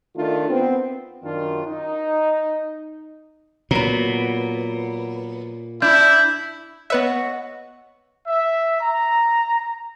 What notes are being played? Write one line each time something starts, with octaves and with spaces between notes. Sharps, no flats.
D#3 A3 D4 F4
B3 C4
F#2 D#3 D4 F4
D#4
A#2 F#3 B3
D4 E4 G6
B3 F#4 B4 C#5 D#5 E5 F#5
E5
A#5